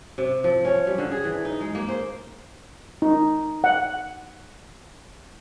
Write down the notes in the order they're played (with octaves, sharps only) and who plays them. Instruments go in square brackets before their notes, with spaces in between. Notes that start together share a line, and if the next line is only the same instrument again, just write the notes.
[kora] C3
F3
C#4
G3
D3
G#4
E3
D#4
G#3
A#3
C5
[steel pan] D#4
F#5